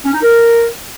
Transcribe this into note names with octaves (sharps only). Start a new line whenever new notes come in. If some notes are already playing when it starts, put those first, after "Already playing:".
C#4
D#4
A#4